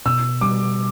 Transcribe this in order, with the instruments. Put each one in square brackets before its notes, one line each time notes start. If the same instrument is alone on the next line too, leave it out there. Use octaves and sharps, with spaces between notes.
[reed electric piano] B2 [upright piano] E6
[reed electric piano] G3 [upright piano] D6